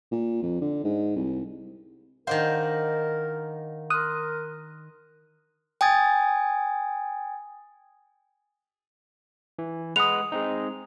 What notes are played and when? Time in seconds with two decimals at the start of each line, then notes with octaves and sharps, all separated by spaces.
0.12 A#2
0.43 F2
0.61 D3
0.84 G#2
1.16 C2
2.27 D#3 D4 A#4 C5 D#5 F5 F#5
3.90 A#4 C6 D#6 F6 F#6
5.81 G5 G#5 D#6 G#6 A6
9.59 E3
9.96 G#3 B4 F#5 D#6 F7
10.32 G#3 C4 D#4